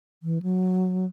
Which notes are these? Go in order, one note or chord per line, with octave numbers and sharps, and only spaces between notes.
E3
F#3